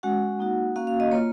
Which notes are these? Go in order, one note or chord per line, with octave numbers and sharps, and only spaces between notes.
G#3 C#4 F#4 F#5
A#3 D#4 F#4
A#3 C#4 F#4 F5
F5
D#5
A#3 F4 C#5